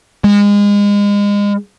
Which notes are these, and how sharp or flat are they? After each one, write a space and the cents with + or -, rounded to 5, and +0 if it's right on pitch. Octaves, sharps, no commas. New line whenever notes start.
G#3 -30